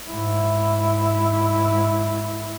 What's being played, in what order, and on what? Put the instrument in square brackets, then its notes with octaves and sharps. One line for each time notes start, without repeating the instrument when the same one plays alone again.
[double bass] G#2 E4